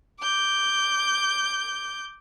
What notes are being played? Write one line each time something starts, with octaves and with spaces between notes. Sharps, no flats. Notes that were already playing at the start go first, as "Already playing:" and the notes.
D6 G6